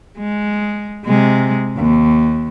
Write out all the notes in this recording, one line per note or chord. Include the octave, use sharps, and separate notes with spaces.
G#3
C3 G#3
D#2